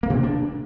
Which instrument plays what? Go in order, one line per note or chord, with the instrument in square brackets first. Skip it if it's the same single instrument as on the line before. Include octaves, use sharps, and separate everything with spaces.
[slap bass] A#3
B2
C4
D4